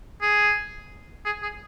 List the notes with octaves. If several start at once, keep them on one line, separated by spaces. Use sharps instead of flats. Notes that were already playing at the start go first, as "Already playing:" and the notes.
G#4
G#4
G#4